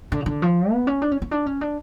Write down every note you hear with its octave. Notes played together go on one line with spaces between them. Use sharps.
D3
C#3
D3
F3
B3
C#4
D4
C#4
C#4
D4
C#4
D4